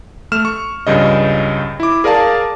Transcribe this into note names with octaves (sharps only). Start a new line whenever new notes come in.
A3 F6 E7
C#6
C#2 G2 C#3 D#5
E4 D6
G#4 A#4 D5 F5 A5